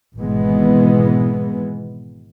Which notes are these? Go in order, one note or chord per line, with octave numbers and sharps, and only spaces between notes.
G#1 B2 E3 G#3 B3